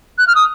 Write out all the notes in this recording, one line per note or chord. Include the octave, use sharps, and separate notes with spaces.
F#6
F6
D#6